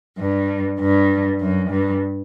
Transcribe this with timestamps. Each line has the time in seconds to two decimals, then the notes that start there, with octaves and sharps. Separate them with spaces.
0.19 G2
0.79 G2
1.40 F#2
1.70 G2